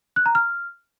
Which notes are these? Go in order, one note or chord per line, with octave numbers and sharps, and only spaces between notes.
F#6
A#5
F6